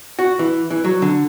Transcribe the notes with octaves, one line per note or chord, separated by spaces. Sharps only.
F#4
E3
E3
F#3
D3